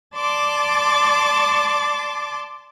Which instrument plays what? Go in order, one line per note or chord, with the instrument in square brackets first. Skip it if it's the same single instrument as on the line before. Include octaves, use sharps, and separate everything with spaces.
[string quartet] D5 A5 C6 D6